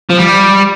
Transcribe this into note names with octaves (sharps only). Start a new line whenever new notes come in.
F3
G3